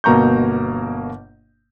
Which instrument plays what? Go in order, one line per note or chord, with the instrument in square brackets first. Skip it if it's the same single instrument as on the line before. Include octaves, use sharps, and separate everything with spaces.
[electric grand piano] G1 B2 A#3 A#5 C#6 G6